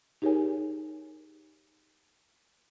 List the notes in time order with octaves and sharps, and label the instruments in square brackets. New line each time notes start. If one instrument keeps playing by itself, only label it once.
[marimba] D#4 G4 G#4 A#4 C#5 G#5